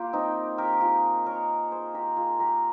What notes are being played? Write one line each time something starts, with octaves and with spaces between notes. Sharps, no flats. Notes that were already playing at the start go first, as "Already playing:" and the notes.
Already playing: A#3 F4 G4
C4 D#4
G4 A#4
F4 G#4
A#4 C#5
G#4 C5
G4 A#4
F4 G#4
G4 A#4